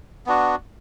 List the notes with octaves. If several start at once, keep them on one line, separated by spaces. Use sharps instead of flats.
B3 D4 F#4